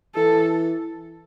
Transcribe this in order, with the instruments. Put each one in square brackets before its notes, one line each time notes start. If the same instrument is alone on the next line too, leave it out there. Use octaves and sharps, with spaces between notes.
[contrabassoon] E3 [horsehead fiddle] A4